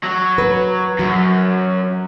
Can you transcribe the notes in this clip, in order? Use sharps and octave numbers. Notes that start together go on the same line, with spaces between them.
F#3
B4
F#2 F#3